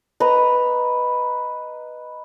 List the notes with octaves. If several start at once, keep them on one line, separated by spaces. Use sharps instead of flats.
B4 D#5 A#5